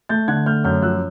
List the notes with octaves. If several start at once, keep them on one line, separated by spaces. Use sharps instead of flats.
A3 G6 A6
D3 F#6 G#6
A3 F6 G6
F#2 F6 G6
F3 E6 F#6